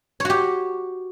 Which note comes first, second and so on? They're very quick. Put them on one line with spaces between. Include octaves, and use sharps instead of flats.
C#5 F#4 G4